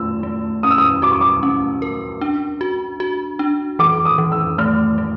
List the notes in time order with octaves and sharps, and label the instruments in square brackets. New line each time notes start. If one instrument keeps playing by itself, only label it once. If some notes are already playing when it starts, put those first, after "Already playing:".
Already playing: [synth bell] A3 F4 [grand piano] E6
[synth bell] A3
[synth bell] C#4 [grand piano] D#6
[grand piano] E6
D#6
[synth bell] F#4 [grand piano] D6
[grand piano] C#6
D6
[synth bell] C#4
A#4
D4
F#4
F#4
D4
[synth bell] E3 [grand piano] D6
[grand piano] D#6
[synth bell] E3
[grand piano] E6
[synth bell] A3 [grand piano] F6
[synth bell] A3